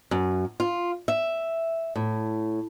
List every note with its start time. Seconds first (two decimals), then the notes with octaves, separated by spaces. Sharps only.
0.11 F#2
0.60 F4
1.08 E5
1.96 A2